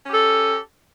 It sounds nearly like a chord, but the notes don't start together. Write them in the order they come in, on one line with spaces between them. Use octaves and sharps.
C#4 G4 A4